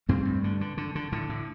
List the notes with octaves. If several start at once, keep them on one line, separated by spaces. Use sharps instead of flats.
G2 A3 C4
G2
D3
D3
D3
D3
A2 D3
A2